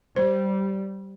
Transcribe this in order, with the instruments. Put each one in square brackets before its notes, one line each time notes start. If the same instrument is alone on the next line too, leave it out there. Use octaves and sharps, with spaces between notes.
[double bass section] G3 [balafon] C5